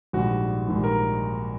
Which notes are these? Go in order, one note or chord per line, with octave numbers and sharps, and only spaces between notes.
A#1 G#2 D#3 G3 F#4
A#1 G#2 D#3 G3
A#4